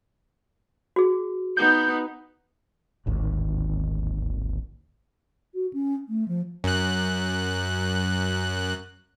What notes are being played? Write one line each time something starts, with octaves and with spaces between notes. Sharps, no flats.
F#4 G#4
B3 D#4 G6
D1 G#1 D#2
F#4
C#4
A3
F3
F#2 F#6